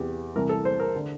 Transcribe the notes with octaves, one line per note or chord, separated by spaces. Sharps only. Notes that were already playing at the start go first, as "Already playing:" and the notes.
Already playing: E2 C3 E3 G4
C2 C3 E3 A#4
A4
C5
A#4
D3